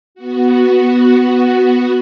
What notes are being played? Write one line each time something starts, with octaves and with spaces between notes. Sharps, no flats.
B3 F#4